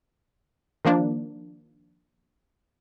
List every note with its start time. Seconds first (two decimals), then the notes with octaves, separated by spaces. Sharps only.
0.85 D#3 F3 A#3 D4